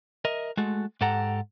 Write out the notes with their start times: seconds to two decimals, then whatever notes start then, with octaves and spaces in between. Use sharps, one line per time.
0.25 A#4 D#5 E5
0.57 G#3 A3 F#4 A4
1.01 G#2 G4 A4 F#5 A#5